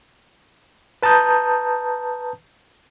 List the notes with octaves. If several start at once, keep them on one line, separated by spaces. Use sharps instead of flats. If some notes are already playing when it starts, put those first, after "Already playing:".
B4 A5 A#5 D#6 G6